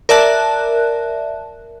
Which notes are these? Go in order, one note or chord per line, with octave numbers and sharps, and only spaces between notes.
A#4 D5 E5 A5 F#6